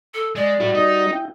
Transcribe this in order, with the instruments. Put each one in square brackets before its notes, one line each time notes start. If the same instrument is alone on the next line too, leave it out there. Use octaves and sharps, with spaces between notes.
[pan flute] A4
[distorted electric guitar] G#3 [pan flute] D5
[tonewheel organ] G3 F#4 [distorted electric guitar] E4 A4
[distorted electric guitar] D#4 [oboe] D#5
[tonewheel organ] E4 G5